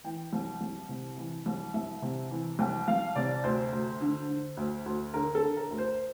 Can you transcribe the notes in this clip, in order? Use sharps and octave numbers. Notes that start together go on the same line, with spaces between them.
E3 G5
C2
C2
C3
E3
C2
C2 E5
C3
E3
C2 G5
C2 F5
C3 D5
D2 C5
D2
D3
D3
D2
D2
D3 A#4
A4
D3
A#4
D2
C5